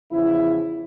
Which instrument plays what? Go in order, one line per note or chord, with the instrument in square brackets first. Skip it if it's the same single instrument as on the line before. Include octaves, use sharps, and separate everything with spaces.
[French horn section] E2 C#3 F3 E4